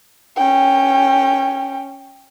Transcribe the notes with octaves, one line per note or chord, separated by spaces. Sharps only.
C#4 G5